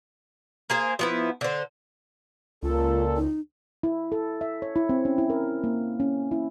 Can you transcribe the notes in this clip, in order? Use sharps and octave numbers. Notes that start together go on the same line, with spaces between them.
A#3 G#4 C5
F3 B3 E4
D3 C5
C#2 A#2 F4 A4
D#4
E4
A4
E5
C#5
E4
C4
C#4
E4
A#4
A#3
C#4
E4